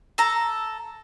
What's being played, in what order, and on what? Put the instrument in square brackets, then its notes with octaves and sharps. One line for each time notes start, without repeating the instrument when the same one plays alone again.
[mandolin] A4 A#5